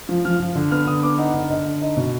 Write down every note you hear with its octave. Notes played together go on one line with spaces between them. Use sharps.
F3
F3 F6
F3
D3
B3 F6
D3 D#6
B3 D6
D#4 F#5
D3
D3 D#5
D3
D#4 D#5
B2